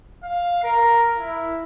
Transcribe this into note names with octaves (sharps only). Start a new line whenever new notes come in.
F5
A#4
E4